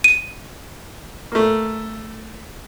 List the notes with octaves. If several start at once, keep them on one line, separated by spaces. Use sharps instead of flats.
D#7
A3 A#3